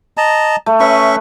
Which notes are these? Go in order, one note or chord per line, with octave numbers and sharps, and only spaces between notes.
D#5 A5 A#5
A3
C#4 B4 E5 C#6